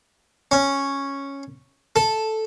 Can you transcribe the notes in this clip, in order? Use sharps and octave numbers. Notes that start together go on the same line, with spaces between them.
C#4
A4